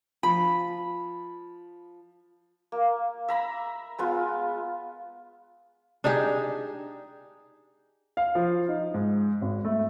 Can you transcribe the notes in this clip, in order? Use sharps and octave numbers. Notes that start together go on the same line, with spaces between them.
F3 B5
A#3
E5 A#5 B5
G#3 B3 F4
D4 D#4 G4 G#4
F5
F3
D#4
G#2
G#1
A3